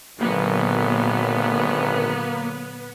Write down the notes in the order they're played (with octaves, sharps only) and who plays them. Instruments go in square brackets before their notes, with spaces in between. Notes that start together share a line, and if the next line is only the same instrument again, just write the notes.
[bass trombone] G#1 [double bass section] A#2 D3 F#3 [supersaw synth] A#3 [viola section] B3